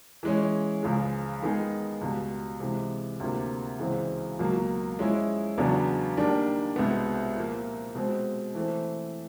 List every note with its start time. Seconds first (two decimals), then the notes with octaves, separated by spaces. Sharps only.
0.23 E3 G#3 C#4
0.83 C#2 C#3 F3 G#3
1.42 D#3 G#3 B3 D#4 G#4
2.01 C#2 B2 G3
2.60 C3 E3 G#3
3.20 D2 C3 F3 A#3
3.79 C#2 C#3 E3 G#3 C4
4.39 C#2 B2 F#3 A#3
4.98 F3 G#3 C#4 E4
5.58 E2 C#3 F#3 B3 D4
6.17 D#3 G3 A#3 D4
6.76 C2 B2 G#3 B3
7.36 A#2 F3 A#3
7.95 B2 G#3 C4
8.55 E3 A3 C4